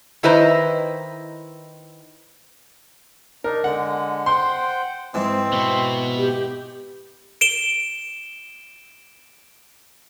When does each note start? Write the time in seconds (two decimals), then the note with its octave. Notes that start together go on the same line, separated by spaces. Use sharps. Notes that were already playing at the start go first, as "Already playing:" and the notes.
0.23 D#3 E4 B4 C5 D#5 A#5
3.44 D4 D#4 A#4
3.64 D3 G#3 F#5
4.26 C5 F#5 G5 C6
5.14 G#2 E3 C4
5.52 B2 B3
6.17 G4
7.41 D7 E7 G7